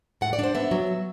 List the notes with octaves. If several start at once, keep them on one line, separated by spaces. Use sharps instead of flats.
A2 F#5
D5
D4 C5
B3 E5
F#3